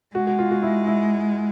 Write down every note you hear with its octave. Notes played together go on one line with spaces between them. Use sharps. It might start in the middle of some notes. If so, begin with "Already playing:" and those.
G#3 F#4
F#4
F4
F#4
E4
E4